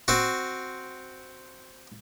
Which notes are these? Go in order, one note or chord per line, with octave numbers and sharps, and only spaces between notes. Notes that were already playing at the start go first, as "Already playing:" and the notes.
C4 F#4